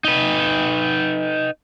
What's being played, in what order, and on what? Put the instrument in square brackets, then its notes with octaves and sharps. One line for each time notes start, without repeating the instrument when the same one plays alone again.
[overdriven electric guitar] D#4 B4